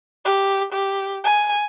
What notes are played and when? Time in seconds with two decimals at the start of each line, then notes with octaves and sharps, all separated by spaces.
0.25 G4
0.72 G4
1.24 G#5